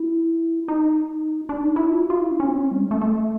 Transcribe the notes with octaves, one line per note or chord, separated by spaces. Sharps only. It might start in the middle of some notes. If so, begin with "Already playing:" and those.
Already playing: E4
D#4
D4
D#4
E4
F4
F#4
F4
E4
D4
C#4
C4
C#4
G3
G#3
A3
A3